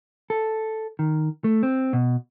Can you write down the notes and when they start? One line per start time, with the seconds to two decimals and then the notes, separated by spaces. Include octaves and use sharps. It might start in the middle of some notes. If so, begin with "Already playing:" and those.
0.30 A4
0.99 D#3
1.44 A3
1.63 C4
1.93 B2